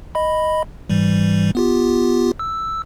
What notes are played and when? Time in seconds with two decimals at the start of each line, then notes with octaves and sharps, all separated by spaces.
0.15 D#5 B5
0.89 G#2 E3 G3
1.55 B3 F4 G4
2.39 E6